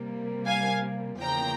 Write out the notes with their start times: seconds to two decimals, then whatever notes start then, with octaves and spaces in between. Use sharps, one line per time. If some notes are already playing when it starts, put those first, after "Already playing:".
Already playing: C3 G3 A#3
0.47 F5 G#5
1.20 E2 C#3 F3 A#3 G5 A#5